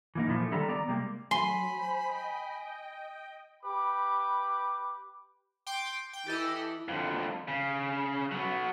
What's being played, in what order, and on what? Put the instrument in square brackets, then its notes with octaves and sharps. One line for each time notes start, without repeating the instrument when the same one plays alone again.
[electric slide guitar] E3 A#3 D#4
A#2 F3 E4
A3
D3 D#3 G3 A4 A#5
B3 D5 A#5
C3 G3 G#3 A#3
[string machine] F#3 [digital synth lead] G#5 [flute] B5 [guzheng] C6
[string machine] C5
D#5 G5
[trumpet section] G4 B4 B5 D6
[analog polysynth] G5 C6 D6
G5
[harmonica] E3 [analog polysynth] G4 A4 D#5
[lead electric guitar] F2 D3
C#3
F#3 B3